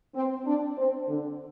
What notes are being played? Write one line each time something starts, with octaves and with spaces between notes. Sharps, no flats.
C4
D4
C4
D3